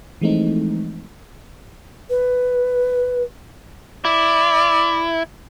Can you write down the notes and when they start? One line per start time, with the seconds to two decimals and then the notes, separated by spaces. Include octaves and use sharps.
0.21 E3 F3 G#3 A3 C4 D#4
2.10 B4
4.05 E4 D5